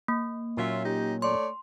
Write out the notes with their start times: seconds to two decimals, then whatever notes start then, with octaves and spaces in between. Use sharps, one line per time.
0.08 A#3
0.57 A#2 F#3 C#4 F4 E5
0.85 D#4 G4
1.22 A3 C#5 D5 C6